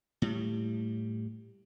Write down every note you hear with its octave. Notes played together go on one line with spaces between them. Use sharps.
A2 G3